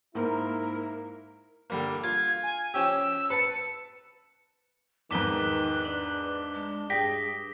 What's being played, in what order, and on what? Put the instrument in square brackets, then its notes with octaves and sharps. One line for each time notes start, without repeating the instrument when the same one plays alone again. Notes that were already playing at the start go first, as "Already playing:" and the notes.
[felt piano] G#2 A#3 [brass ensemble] E4 [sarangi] A#4
[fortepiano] D3 G3 A#3
[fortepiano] F4 [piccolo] G#6
[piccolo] G#5
[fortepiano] F3 C#4 G4 [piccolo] E6
[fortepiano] B4 A5 [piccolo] C#7
[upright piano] E2 G#2 [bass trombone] D#3 [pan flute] B4 [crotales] D6 B6 G7
[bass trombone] D4 [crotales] F#7
[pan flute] G#3
[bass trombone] G2 [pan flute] G#4 [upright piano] G5 [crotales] A#6 B6